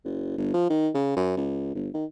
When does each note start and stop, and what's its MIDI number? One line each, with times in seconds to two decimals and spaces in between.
0.05 0.34 30
0.38 0.50 31
0.54 0.68 53
0.70 0.90 51
0.95 1.12 49
1.17 1.33 42
1.37 1.71 37
1.75 1.89 31
1.94 2.05 51